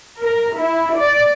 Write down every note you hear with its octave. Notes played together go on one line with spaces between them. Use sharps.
A#4
E4
D5